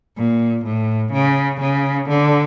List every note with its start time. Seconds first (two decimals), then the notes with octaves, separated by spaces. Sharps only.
0.17 A#2
0.65 A2
1.13 C#3
1.60 C#3
2.09 D3